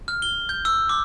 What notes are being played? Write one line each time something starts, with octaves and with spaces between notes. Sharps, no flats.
F6
G7
G6
E6
D6